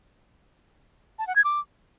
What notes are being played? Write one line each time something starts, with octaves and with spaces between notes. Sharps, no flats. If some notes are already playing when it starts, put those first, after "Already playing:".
A5
F#5
G#6
D6